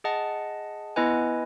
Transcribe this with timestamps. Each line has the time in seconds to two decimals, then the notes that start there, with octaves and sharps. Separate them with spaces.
0.04 G#4 D#5 F#5 A5
0.96 B3 E4 B4 D#5 G#5